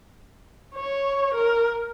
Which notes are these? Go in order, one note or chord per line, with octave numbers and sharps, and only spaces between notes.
C#5
A#4